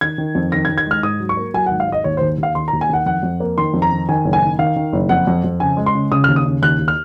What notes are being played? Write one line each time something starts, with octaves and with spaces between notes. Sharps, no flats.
D#3 G#6
D#3
F2
D#3 A#6
G#6
D#3
G#6
G#3 F6
G#2 D#6
F#3
C#6
A#3
F#3 G#5
F#5
G#1
F5
G#2 D#5
D#2 C#5
C5
D#2
D#2 F5
D#3 C6
A#5
D#2
G#5
D#3 F#5
F2 F#5
F2
A#3
D#3 C6
F2
A#5
D#3
D#3 G#5
F#1
G#5
D#3
D#3 F5
D#3
F#1
F2 F#5
F2
F2
C#3 G#5
G#3
C6
C#3
C#3 D#6
F6
D#2
D#6
C#3
D#2 F#6
D#2
F6